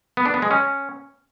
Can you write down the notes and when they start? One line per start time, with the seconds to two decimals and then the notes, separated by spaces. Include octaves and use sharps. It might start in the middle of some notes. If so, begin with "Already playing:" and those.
0.17 B3
0.26 D4
0.34 B3
0.42 G#3
0.51 C#4